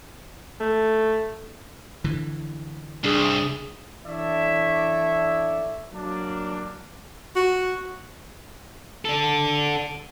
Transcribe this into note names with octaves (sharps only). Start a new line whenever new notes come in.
A3
D3 E3
C2 D4 G#4 D#6
E3 D4 A4 C#5 D5 E5
F#3 A#3 D4
F#4
D4 A4